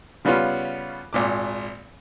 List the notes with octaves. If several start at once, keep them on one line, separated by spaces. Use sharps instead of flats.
C#3 G3 B3 C#4 F4
G#1 A#2 D6